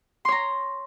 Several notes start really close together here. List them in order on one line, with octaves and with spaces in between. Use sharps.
C6 C#5 A#5